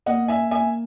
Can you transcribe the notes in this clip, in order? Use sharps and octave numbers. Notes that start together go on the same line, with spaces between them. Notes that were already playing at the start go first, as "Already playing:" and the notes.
A#3 D#5 F#5
E5 G#5
A#3 E5 G#5